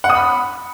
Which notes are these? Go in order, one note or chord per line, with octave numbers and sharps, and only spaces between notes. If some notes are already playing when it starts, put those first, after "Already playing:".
F#5
D#6
B5